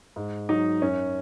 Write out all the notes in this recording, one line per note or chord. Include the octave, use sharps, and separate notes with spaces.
G#2
F#3 D#4
F#2 C#4